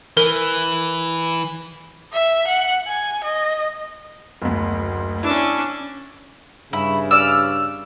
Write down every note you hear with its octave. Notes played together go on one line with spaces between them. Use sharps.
E3 A#4
E5
F#5
G#5
D#5
F#1 D2
C#4 D4 E4 E6
G2 C#3 E4
D5 E6 F6